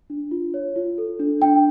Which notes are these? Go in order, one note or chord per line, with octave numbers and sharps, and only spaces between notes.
D4
F4
C#5
F4
A4
D4
D4 G5